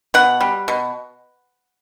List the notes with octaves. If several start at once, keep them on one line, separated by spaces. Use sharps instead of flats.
B2 F#5
G3
B2